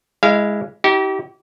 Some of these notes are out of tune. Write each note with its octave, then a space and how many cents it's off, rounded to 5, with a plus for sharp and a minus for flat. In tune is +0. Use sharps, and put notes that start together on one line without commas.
G#3 +0 E4 +0 F5 -25
D#4 +40 G4 -30